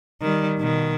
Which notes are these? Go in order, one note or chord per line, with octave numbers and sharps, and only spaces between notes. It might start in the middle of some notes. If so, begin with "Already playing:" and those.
D#3 G3
B2 D#3